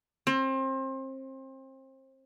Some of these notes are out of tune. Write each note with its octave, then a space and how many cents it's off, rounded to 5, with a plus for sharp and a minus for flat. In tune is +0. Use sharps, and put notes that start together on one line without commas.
C4 +30